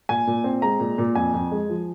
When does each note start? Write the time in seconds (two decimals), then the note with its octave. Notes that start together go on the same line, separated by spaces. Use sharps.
0.09 A#2 G#5
0.27 A#2
0.44 C4
0.62 G#3 A#5
0.80 A#2
0.98 A#2
1.15 F2 G#5
1.34 F2
1.52 G#3
1.70 F3